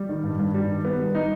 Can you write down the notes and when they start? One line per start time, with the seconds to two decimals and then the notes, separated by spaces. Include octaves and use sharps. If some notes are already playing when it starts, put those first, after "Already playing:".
Already playing: G3
0.09 D#3
0.23 G2
0.39 G2
0.54 G3
0.69 D#3
0.85 B3
0.99 G3
1.15 D#4